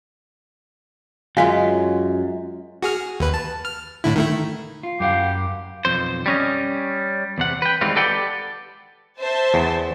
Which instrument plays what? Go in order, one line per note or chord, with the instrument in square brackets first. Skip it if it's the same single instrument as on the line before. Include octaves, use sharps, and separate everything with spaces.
[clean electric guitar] F#2 [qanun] G#3 C#4 F4 [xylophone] F5 G#5 B6
[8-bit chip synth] F#4 G#4 F6
D#2 B4
A5
F6
A2 D3 E4
D#3 A3 E4
[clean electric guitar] F4
[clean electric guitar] F#2 F5 F#5 [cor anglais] G4
[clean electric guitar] B1 F2 C5
G3 C#4 D#5
E2 C3 F#5
B4 G5
D#3 E3 G3 G#3 C4 F4
G4 A4 B4 D5 F#5 G5
[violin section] C5 E5 A5
[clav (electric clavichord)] E2